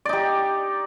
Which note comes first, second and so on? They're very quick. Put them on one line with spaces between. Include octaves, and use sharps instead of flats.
D5 D#4 G4